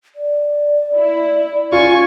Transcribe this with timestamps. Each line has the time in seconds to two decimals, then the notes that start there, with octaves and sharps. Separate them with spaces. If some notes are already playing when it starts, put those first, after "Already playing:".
0.15 D5
0.94 E4
1.72 C#4 F4 G#5 C#6